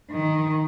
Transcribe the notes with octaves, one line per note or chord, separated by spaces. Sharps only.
D#3